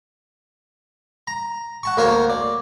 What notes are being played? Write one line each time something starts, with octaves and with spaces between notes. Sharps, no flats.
A#5
F#5 A5 C#6
D2 A#3 A#4 C#5 A5 C6
D5